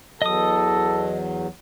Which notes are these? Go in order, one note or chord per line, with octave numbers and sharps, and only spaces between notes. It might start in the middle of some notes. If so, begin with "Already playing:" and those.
E2 F#3 A4 D#5 D#6